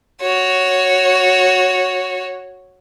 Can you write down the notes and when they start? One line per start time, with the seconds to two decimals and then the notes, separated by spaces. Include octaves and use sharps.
0.21 F#4 C#5